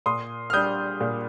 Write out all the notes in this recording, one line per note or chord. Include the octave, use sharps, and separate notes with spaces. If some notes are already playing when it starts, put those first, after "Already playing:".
A#2 C6 D#6
F6
G3 D4 D#6 G6
A#2